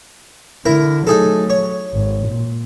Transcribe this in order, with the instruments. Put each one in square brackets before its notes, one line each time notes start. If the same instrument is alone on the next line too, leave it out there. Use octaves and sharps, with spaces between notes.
[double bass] D3 [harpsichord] E4 A#4
[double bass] F#3 A3 [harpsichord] D#4 G#4 A4
[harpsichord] C#5
[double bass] G#1
A#2